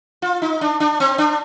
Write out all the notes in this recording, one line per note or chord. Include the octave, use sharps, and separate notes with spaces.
F4
D#4
D4
D4
C4
D4